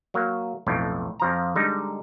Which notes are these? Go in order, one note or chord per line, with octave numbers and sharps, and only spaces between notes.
F#3 A#3
B1 F2 A2
F2 F3 A#5
D3 G3 G#3 D#4